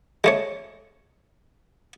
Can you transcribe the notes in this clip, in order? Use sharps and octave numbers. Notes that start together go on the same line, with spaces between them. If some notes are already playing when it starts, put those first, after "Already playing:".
G#3 A3 C#5